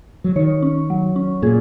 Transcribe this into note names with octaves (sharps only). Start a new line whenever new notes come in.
F#3
D#3 C#5
C#4
F#3
C#4
A#2 G#4